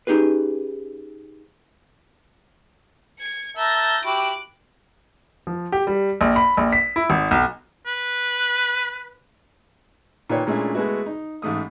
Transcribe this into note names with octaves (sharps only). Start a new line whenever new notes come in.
C#4 D#4 G4 G#4 B4
G#6 C#7
A#4 E5 A5 G6 A#6
E4 F#4 G4 D6 F#6
F3
G4
G3
A#1
B5
A#1
B6
E4
G#1
B1
B4
A#2 D#3 B4 C#5 G5
A#2 G#3 A3 C#4 D4 E4
G#3 A3 B3 E4 F#4
D#4
A1 G#2 A3 D#6